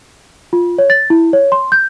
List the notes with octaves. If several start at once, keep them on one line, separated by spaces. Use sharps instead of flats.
F4
C#5
A6
E4
C#5
C6
G6